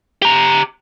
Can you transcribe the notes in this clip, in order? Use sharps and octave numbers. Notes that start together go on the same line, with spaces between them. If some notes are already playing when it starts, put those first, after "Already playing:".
G4 A#5